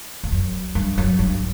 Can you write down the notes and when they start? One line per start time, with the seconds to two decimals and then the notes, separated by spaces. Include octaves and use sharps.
0.24 E2
0.32 F#2
0.75 G2
0.98 F#2
1.19 G2